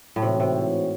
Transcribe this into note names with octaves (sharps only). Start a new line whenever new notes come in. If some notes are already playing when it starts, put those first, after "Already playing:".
A2
G#2 C3 E3 C4 F#4 C#5
C3